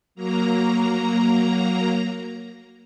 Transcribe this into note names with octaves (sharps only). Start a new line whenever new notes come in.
F#3 A#3 A#5